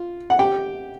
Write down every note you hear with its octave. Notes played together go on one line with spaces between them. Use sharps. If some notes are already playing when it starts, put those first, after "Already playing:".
Already playing: F4
F#5
G4 G5